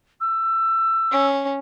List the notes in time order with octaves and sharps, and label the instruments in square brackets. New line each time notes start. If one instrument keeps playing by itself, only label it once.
[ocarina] E6
[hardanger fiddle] C#4